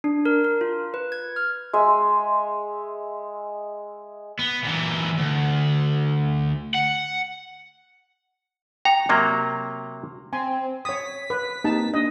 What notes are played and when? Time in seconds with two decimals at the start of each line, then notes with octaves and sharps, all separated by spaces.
0.04 D4
0.25 A#4
0.44 A#4
0.61 F4
0.94 B4
1.12 G#6
1.36 F6
1.73 G#3 E5
4.39 B3
4.63 A#2 E3
5.18 D2
6.74 F#5
8.85 G5 A#5
9.09 C3 F#3 A#3
10.33 C4 G#5
10.85 C#5 D#6 B6
11.30 B4
11.64 A#3 C4 D#4 G4 A5
11.94 A#3 D4 D#5